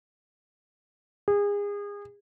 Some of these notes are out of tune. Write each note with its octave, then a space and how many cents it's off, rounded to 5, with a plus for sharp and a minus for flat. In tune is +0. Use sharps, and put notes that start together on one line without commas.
G#4 -30